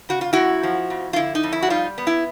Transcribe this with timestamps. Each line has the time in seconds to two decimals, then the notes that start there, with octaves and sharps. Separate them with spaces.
0.09 C#3 F#4
0.21 F4
0.33 F#2 E4 F#4
0.63 F3
0.90 F2
1.13 F4
1.16 D3 E4
1.35 D#4
1.43 F2
1.53 E4
1.63 F#4
1.70 G3 D#4 F4
1.98 B3
2.07 E4